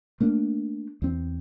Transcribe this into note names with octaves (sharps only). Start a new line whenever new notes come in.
A3 A#3 D4
E2 C4